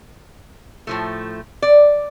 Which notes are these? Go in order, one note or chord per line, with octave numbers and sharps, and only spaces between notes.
A2 F3 A3
D5